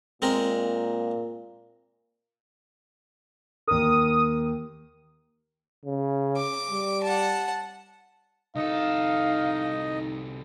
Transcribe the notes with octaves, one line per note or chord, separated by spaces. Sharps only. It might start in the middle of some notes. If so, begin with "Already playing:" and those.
A#2 G#3 C4 A#4
D#2 A#4 D#6
C#3
D6
G3
F#5 A5
C2 D#4 A4 D#5 F5